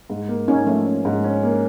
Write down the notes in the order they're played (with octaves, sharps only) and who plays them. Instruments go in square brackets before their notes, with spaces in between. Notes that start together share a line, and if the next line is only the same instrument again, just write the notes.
[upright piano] G#2
A#3
[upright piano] G#2 [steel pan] C#4 D#4
[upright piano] F3 [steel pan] A3
[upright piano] C#4
G#2
C#4
A#3